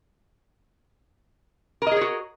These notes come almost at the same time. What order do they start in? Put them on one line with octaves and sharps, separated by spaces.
A#4 D#5 G#4 C#5 F#4